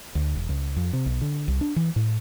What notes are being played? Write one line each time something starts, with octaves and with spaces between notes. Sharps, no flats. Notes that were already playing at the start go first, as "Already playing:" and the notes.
D2
E1
C#2
F2
C3
B1
D3
C2
D4
E3
A2